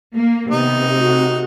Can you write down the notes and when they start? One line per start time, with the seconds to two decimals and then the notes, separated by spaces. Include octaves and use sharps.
0.15 A#3
0.51 C3 D#3 B3 D#4
0.95 A3 F#4